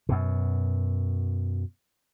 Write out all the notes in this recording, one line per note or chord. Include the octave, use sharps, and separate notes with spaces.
F#2 B2